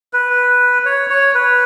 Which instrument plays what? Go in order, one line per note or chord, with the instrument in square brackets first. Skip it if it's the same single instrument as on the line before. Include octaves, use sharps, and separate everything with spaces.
[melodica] B4
C#5
C#5
B4